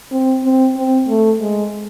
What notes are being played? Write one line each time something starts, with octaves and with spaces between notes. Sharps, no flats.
C4
C4
C4
A3
G#3